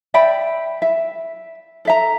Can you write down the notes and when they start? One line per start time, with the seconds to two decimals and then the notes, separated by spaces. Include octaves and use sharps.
0.14 D5 E5 G5 B5
0.82 E5
1.85 A4 E5 A#5